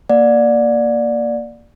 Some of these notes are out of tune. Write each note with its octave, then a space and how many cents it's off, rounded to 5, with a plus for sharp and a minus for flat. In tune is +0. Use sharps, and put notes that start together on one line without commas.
A#3 +0 D5 +5 F#5 -40